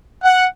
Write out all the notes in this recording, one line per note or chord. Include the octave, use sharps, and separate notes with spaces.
F#5